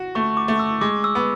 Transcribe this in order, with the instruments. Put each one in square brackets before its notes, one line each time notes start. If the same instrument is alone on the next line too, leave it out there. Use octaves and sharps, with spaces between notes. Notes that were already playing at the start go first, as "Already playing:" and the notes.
Already playing: [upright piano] F#4
[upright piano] A3 [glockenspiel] C#6
[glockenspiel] D6
[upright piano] A3
[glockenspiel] E6
[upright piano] G#3 [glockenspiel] D6
[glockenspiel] E6
[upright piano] B3